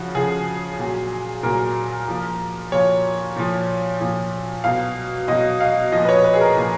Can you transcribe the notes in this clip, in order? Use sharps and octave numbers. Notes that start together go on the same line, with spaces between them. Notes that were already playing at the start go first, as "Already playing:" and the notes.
Already playing: C#3 F3 F#4
C#3 F3 G#4
A#2 F#3
A#2 F#3 A#4
A#2 F3
A#2 F3 C#5
A#2 F3
A#2 F3
B2 F#3 F5
B2 F#3 D#5
F5
A#2 F3 D#5
B4
C#5
B4
G#4
A#4
A#2 F3